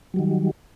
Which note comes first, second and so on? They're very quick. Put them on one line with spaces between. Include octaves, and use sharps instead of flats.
F#3 G3 D#3